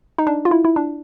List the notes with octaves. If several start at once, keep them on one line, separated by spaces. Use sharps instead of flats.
D#4
D4
F4
E4
E4
D4